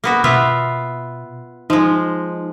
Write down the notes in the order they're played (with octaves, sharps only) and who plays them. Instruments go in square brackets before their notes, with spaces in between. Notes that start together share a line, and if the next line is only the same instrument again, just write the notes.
[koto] A#3 B3 F#4
[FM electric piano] B2 [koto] B3 F4 E5
[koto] F3 G#3 [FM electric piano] D#4